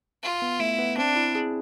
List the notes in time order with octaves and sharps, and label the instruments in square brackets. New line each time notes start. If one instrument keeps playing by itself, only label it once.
[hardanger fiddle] F4
[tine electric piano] B3
[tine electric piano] A3 [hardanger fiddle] E4
[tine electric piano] B3
[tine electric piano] C4 [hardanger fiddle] D4
[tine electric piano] E4
G#4